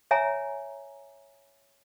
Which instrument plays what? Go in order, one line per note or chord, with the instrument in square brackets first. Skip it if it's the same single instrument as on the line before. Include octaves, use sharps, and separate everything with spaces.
[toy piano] C#5 E5 G#5 A#5